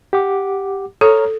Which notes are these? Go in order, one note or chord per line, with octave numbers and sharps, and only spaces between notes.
G4 F#5 D6
A4 C#5 A#5 F6